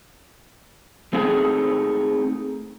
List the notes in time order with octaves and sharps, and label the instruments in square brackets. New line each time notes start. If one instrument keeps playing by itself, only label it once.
[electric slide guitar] A3 C4 D#4 G#4 F#5 G#5